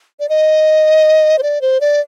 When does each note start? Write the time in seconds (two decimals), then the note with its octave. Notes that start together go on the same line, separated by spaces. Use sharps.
0.20 D5
0.29 D#5
1.39 C5
1.43 D5
1.61 C5
1.81 D5